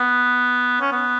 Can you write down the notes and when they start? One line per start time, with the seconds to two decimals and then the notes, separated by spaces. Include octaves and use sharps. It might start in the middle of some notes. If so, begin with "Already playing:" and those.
Already playing: B3
0.81 C#4
0.92 B3